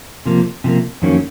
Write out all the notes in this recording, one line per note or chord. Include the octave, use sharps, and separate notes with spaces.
C3 F3 A#3
C3 F3 A#3
F2 D#3 F#3 A#3 C#4